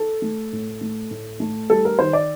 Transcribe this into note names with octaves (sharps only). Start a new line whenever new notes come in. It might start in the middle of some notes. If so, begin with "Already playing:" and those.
Already playing: A4
A3
A2
A3
A2
A3
G3 A4
A#4
D#3 C5
D5